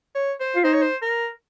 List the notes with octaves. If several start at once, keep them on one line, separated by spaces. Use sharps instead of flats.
C#5
C5
F4
D#4 C5
C#5
C5
A#4